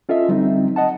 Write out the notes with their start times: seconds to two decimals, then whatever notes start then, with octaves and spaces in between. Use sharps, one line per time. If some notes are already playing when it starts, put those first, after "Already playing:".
0.09 C#4 F4 A4 D#5 E5
0.28 D3 F#3 G3 C4 D#4
0.76 D#5 F#5 A5